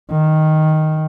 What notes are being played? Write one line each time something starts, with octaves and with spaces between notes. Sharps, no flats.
D#3